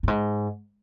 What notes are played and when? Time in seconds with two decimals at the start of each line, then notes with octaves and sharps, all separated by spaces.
0.03 G2
0.08 G#2